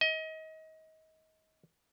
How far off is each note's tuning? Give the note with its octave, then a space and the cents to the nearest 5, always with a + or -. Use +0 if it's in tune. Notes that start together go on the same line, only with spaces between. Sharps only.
D#5 +30